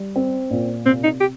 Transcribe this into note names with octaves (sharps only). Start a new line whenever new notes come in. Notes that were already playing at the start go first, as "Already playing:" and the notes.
Already playing: G3
C4
A#2
C3 C4
D#4
G4